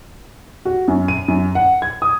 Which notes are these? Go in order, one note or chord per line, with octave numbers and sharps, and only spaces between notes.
F#4
F#2
D#7
F#2
F#5
G#6
D#6